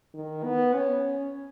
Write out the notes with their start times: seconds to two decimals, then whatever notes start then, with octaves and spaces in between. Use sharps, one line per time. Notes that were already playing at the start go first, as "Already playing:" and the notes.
0.14 D#3
0.44 B3
0.75 C#4